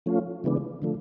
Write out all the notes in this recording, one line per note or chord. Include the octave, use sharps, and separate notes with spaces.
F3 A3 C#4 F4
C#3 E3 G#3 B3 D4
D3 F3 A3